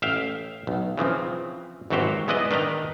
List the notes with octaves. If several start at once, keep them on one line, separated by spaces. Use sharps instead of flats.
A1 E5 F5 G5
B1
C#3 E3 F3 C4
G#1 E3 F#3 F#4 G4 C5
G#3 B3 E4 B4 D5 D#5
D#3 D4 B4 G5 A#5